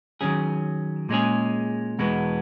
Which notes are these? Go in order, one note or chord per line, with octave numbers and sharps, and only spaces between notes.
D#3 F#3 C#4 G#4
A#2 G#3 C#4 G#4
E2 B2 G#3 B3